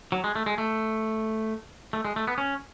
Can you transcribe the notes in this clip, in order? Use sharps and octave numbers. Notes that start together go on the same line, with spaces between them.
F#3
G#3
A3
G#3
A3
A3
G#3
A3
B3
C#4